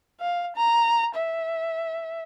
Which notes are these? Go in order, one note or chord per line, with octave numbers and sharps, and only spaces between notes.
F5
A#5
E5